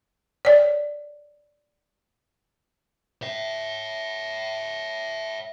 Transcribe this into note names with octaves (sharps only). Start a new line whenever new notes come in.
C#5 D5
C#5 E5